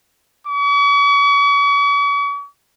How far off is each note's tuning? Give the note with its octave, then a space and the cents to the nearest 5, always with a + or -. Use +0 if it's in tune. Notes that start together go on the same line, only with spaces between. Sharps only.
C#6 +45